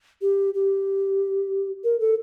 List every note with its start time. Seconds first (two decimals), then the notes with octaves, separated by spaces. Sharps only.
0.22 G4
0.54 G4
1.84 A#4
2.00 A4